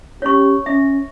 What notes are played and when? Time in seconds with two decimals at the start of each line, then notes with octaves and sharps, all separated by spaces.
0.22 C#4 G4 C#5 C#6
0.66 C#4 E5